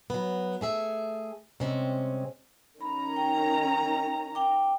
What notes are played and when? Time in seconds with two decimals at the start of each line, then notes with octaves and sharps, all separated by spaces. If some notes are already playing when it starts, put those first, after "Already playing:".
0.10 F#3 B3
0.61 A3 G#4 E5
1.60 C3 G3 G#3 C4 C#4
2.81 D#3 C#4 A#5 B5
3.16 G5
4.35 G5 D6